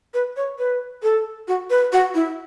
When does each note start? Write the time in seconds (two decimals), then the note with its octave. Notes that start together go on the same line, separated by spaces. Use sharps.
0.14 B4
0.36 C#5
0.59 B4
1.03 A4
1.48 F#4
1.70 B4
1.92 F#4
2.15 E4